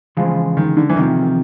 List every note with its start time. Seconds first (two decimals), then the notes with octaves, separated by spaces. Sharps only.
0.17 C#3 E3 F3 G#3
0.57 D#3
0.77 D3
0.90 E3
0.96 E2 C3 D#3 F3